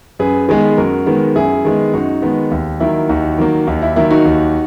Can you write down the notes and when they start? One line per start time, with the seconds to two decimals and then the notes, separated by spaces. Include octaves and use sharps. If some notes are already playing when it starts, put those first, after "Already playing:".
0.19 F#2 G#4 B4
0.48 D#3 G#3 B3 G#4 B4
0.78 F#2 F#4 A#4
1.06 D#3 G#3 B3
1.35 F#2 E4 G#4
1.65 D#3 G#3 B3
1.93 F#2 D#4 F#4
2.22 D#3 G#3 B3
2.51 D#2
2.80 D#3 F#3 A#3 E4
3.09 D#2 D#4 F#4
3.38 D#3 F#3 A#3
3.67 D#2 D#4
3.82 E4
3.96 D#3 F#3 A#3 E4
4.11 D#4 F#4
4.25 D#2